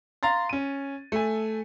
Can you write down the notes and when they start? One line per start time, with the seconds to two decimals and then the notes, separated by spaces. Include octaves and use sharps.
0.23 F5 A#5 C6 A6
0.49 C#4 D#7
1.12 A3 G#5